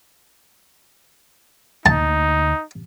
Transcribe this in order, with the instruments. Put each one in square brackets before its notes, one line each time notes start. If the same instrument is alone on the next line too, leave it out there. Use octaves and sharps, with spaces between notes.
[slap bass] D2 A#3 [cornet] D#4 [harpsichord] A5